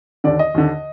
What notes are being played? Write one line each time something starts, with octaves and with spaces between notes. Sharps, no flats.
D#2 D3 D5
D#5
D#2 D3